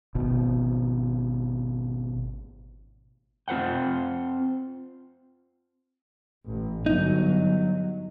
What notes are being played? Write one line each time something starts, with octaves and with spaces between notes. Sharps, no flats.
G#1 B2
C4 F4 C5 F#5 G5
A1
G1 F#3 D#4